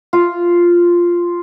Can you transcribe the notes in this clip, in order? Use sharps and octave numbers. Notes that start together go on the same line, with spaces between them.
F4